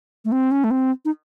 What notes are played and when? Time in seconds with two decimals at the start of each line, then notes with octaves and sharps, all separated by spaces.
0.25 A3
0.32 C4
0.51 C#4
0.64 A3
0.71 C4
1.05 D#4